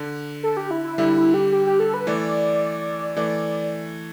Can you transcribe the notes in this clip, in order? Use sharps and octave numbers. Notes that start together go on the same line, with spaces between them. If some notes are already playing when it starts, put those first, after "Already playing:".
Already playing: D3
A4
G4
E4
E4
D3 G3 E4
E4
G4
G4
G4
A4
B4
E3 A3 D5
E3 A3 D5